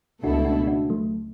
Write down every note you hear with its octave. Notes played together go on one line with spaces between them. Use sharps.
C#2 B2 A3 D4 E4 F#4 A4
D4 F#4
D4 F#4
F#3 A3